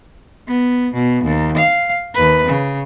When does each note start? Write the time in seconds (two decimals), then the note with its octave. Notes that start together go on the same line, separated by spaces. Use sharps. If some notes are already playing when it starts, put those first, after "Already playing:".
0.47 B3
0.94 B2
1.24 D#2
1.57 F5
2.14 D#2 B4
2.48 C#3